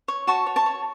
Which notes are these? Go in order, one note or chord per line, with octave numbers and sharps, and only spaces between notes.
C#5
F#4 A5 C#6
C#5
A5 C#6
C#5